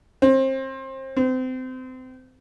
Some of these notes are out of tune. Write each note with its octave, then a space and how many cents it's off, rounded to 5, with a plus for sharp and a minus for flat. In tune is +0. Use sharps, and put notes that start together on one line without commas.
C4 +25
C4 -30